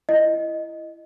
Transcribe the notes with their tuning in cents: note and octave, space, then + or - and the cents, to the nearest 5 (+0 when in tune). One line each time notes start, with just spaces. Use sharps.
E4 +25 D#5 +0